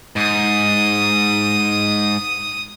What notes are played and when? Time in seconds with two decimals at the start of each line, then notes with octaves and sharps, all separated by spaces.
0.16 G#2 D#6